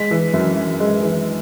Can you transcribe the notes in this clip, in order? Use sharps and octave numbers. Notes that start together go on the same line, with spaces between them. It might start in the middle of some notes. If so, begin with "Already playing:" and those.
Already playing: G#3 B6
E3
F#2
F#2
G#3
E3